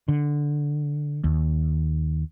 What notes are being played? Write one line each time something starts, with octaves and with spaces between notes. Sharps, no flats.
D3
D#2